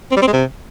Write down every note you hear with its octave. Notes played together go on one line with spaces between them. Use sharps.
C4
G3
C4
G#3
C3